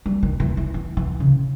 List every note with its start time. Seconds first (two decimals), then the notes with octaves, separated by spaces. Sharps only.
0.06 G3
0.23 D#3
0.40 E3
0.57 E3
0.74 E3
0.97 E3
1.20 C#3